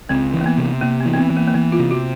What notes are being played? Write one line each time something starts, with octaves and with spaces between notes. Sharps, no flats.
C#2 C4
E3
A#3
B3
C3
C3 A#3
B3
E3
C4
B3
E3
A#3
A#3
E3 B3
F4
C3
F#4